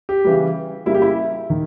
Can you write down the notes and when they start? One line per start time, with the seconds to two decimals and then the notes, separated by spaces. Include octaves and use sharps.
0.09 G4
0.24 C#3 E3 G3
0.86 C#3 G3 A#3 E4
0.95 G4
1.02 E4
1.50 D#3